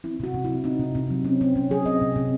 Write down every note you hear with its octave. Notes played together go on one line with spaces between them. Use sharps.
C4 E4
C3 F#4
C3
E4
F#3
C4 D#4
C3
C3
F#3
C4 C#4
C3 C4
C3 C#4
F#3 G#4
C4 D#5
C3
C3